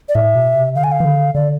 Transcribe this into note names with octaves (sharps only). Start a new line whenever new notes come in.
D5
A2 E5
B2
C3
D3 F5
G#5
F5
E3
D3
D3 D5